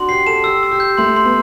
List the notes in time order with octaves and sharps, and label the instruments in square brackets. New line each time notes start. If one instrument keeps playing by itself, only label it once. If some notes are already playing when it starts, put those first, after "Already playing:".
Already playing: [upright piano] D4 F#4 [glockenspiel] C6
[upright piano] G4 [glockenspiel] C7
[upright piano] A4 [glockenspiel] E7
[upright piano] G4 [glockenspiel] E6
[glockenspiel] E6
[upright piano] G4
[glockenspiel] G6
[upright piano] A3 [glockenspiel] C6
[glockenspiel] C6
[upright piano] B3